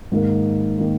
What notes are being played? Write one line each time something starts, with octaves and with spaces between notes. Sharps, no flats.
G#2 D#3 A#3
D#3 A#3